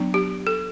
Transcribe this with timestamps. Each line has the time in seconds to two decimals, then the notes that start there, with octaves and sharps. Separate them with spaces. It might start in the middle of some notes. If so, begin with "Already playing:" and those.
Already playing: F#3 B3 D4
0.14 G4
0.47 A4